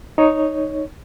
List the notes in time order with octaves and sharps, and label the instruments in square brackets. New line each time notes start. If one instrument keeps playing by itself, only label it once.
[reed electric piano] D#4 C#5